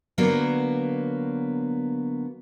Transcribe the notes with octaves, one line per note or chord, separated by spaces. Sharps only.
D3 F#3 A#3 B3